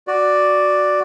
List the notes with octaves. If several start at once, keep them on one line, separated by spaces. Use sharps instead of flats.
F#4 D5